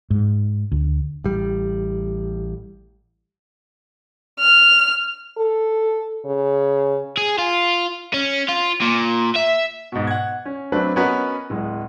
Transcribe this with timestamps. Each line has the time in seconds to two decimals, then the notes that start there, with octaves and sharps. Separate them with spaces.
0.10 G#2
0.72 D2
1.24 A1 G3
4.39 F6
5.37 A4
6.26 C#3
7.17 G#4
7.38 F4
8.14 C#4
8.48 F4
8.81 A#2
9.35 E5
9.92 G#2 B2
10.07 F#5 G#6
10.45 C#4
10.72 F#3 A3 C4 D4 B4
10.96 B3 C#4 F#4 A#4 B4 D#5
11.50 D1 G#3